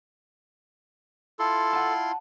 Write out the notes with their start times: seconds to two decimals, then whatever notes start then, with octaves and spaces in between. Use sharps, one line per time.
1.39 E4 F4 A4 C6
1.73 F#5 A5